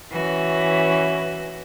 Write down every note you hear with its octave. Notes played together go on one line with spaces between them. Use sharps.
E3 C#4 F#4